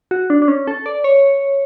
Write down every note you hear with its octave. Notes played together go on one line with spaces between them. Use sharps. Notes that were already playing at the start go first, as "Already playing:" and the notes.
F#4
D4
D4
C#4
A4
D5
C#5